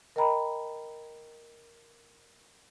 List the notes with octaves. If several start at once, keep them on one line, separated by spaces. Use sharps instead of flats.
A#4 D#5 G5 A#5 B5